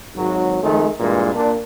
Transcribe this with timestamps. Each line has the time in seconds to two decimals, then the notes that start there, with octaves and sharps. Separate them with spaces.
0.16 G#1 F#3
0.62 F2 D#3 G#3 A3
0.99 G2 A#2 E3 G#3
1.34 A#2 D4